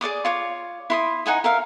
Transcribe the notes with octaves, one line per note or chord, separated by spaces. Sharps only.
G#4 D5 D6 D#6
F4 C#5 D6
E4 C6 D#6
D#4 F#5 G#5 D#6
A#4 E5 F5